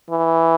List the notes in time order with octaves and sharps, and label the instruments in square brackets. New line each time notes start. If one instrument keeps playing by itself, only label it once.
[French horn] E3